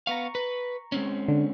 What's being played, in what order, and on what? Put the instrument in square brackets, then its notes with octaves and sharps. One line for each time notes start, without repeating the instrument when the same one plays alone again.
[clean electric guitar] B3 F5 [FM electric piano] A#5 C#6
[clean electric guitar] B4
G#3 C4 C#4
[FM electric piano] D3